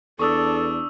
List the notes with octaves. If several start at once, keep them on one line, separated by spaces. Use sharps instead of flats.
E2 D4 A4 C#6 D#6 E6